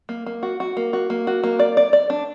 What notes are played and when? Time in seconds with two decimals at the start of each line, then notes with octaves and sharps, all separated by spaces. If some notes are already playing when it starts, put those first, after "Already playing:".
0.09 A#3
0.26 A#3
0.43 F#4
0.60 F#4
0.77 A#3
0.93 F#4
1.10 A#3
1.27 F#4
1.44 A#3
1.59 D5
1.77 D5
1.93 D5
2.10 D4